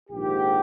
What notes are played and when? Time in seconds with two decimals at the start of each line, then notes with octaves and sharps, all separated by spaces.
0.10 A#1 G#2 D#3 G4